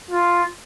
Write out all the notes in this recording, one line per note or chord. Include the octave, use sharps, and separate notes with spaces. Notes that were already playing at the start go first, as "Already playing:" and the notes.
F4